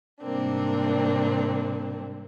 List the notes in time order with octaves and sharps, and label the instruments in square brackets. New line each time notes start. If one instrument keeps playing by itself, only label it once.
[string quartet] G#2 C3 G3 A#3 C4 D4